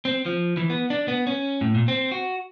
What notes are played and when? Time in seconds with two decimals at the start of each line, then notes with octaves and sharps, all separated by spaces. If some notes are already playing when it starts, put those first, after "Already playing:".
0.05 C4
0.26 F3
0.57 E3
0.70 B3
0.90 D4
1.08 B3
1.27 C#4
1.61 A2
1.75 A#2
1.88 C4
2.11 F#4